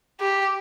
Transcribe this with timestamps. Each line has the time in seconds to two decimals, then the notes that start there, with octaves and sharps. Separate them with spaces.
0.20 G4